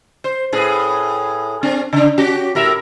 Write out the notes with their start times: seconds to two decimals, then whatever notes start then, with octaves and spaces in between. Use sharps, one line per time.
0.24 C5
0.53 A2 G#4 B4
1.63 C4 D4
1.93 C#3 D4
2.18 C#4 F#4 G4
2.55 A2 A#4 E5